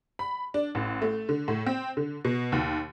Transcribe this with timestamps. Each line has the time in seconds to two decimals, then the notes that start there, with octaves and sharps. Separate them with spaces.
0.19 B5
0.54 D4
0.75 A1
1.02 A3
1.29 D3
1.48 A2
1.66 C4
1.97 D3
2.25 B2
2.52 D#2